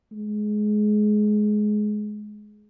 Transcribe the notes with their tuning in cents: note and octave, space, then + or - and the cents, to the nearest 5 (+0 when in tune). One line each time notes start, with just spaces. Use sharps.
G#3 +20